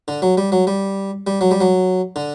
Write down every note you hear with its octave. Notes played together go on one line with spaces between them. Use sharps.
D3
F#3
G3
F#3
G3
G3
F#3
G3
F#3
D3